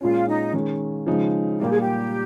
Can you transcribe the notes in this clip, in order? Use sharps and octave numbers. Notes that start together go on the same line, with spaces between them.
A#2 G#3 C#4 F4
D#4
D#3 G#3 C#4
C#3 F3 G#3 D#4
A#2 G3 A#3 F4 G4
G#4
G4